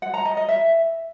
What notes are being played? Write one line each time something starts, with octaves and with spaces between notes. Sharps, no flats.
F#5
A#5
D#5
D#5
E5